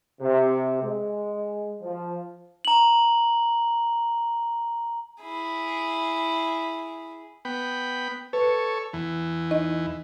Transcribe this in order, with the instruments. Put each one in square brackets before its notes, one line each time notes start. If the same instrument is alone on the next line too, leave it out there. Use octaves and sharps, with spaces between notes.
[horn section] C3
G#3
F3
[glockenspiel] A#5 F#7
[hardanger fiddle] E4 G#4
[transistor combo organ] B3 G5 B5
[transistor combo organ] A4 C#5 [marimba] B4
[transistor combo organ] E2 E3
[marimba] D#4 D#5